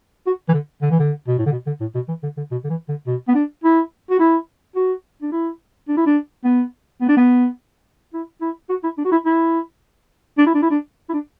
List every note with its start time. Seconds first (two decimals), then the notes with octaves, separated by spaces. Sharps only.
0.27 F#4
0.49 E3
0.54 D3
0.82 D3
0.91 E3
0.99 D3
1.28 B2
1.38 A2
1.46 D3
1.52 B2
1.67 D3
1.81 A2
1.95 B2
2.08 E3
2.23 D3
2.37 D3
2.51 B2
2.64 D3
2.70 E3
2.89 D3
3.07 B2
3.28 B3
3.35 D4
3.64 E4
4.10 F#4
4.20 E4
4.76 F#4
5.22 D4
5.32 E4
5.88 D4
5.97 E4
6.06 D4
6.44 B3
7.01 B3
7.08 D4
7.17 B3
8.14 E4
8.41 E4
8.70 F#4
8.84 E4
8.98 D4
9.05 F#4
9.12 E4
9.26 E4
10.38 D4
10.46 E4
10.54 D4
10.62 E4
10.70 D4
11.09 E4
11.13 D4